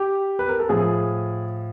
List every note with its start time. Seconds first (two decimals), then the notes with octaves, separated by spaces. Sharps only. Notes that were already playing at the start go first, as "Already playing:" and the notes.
Already playing: G4
0.39 B4
0.49 A#4
0.59 A4
0.69 A2 F3 G#4